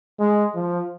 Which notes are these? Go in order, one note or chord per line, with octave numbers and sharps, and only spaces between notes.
G#3
F3